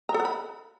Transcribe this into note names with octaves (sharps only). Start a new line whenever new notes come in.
A#5
A4
F#5
B5